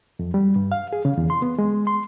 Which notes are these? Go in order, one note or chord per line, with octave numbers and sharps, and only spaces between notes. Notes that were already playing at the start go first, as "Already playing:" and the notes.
F2
G3
G2
F5
G#4
C#3
E2
C6
B3
G#3
C6